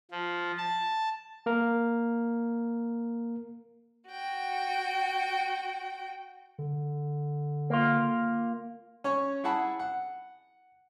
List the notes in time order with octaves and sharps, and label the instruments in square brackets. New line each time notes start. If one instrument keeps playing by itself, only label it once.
[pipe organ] F3
A5
[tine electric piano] A#3 A#4
[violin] F#4 G5
[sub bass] D3
[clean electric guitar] A#3 F4
[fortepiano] C#4 C#5
E4 G#4 F#5 A5 B5
F#5